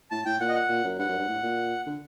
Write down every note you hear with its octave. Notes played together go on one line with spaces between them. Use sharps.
A2 A5
A2 G5
A#2 F#5
D#5
F#5
A#2
F#2
G2 F#5
F#2
G2
A2
A#2
D3